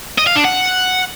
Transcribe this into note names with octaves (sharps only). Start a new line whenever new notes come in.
D#5
F5
D4
F#5